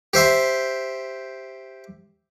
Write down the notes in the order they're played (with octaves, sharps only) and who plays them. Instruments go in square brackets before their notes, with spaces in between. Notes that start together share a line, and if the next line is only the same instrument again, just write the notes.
[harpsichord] G4 C5 E5 C6